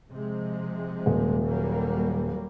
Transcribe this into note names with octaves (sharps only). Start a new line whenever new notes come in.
C3 F3 G#3
D#1
F#3 G3 A#3